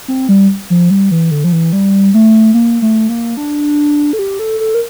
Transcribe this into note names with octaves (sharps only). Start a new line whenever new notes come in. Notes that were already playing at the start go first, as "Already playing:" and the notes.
C4
G3
F3
G3
E3
D3
F3
E3
G3
A3
A#3
A3
A#3
D4
A4
G4
A4
A4
A#4